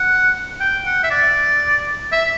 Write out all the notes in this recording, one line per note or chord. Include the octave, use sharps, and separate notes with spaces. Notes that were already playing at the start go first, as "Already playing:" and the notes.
Already playing: F#5
G5
F#5
E5
D5
E5